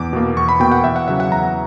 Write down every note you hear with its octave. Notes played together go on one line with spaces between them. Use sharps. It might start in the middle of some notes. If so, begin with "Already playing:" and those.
Already playing: E2 D6
B2 A#3
E2 C#6
B5
B2 A#3 G5
F#5
E2 E5
F#5
C#3 F#3 E5
F#5
E2 A#5